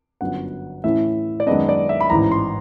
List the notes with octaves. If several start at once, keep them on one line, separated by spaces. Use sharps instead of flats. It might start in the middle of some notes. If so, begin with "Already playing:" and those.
G1 F#2 D3 F#3 B3 F#5
A2 E3 A3 C#4 E4 E5
D5
F#2 D#3 G#3 B3 D4 D#5
D5
E5
B5
A1 G#2 E3 A#5
C6